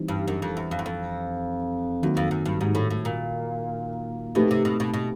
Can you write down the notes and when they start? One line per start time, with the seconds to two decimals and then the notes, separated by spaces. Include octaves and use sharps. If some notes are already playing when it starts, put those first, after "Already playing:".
Already playing: E3 G3 C4 D#4
0.08 G2
0.28 F#2
0.42 F2
0.57 E2
0.71 F2
0.79 E2
0.86 F2
2.02 E2 D#3 F#3 A#3
2.17 F2
2.31 F#2
2.46 G2
2.61 G#2
2.75 A2
2.90 A2
3.05 A#2
4.35 B2 A3 C4 D#4 G4 B4
4.51 C3
4.65 B2
4.80 B2
4.94 B2